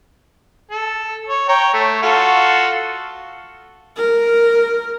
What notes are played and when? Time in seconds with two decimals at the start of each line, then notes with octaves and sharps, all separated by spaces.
0.71 A4
1.28 C#5
1.49 C#5 G5 A#5
1.74 A3
2.03 F4 F#4 A4
3.96 A#4